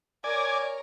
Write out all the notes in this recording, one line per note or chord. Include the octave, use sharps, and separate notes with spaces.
A#4 C#5 D5 G#5